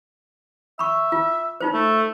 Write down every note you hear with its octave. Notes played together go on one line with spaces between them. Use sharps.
E5 B5 C#6
F4
D#4 F4 C5
A3